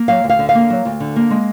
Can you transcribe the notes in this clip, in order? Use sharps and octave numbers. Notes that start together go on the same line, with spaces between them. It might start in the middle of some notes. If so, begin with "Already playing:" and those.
Already playing: A#3
F#3 F5
D2
F5
D3
F5
A#3
F#3
D2
D3
A#3
G#3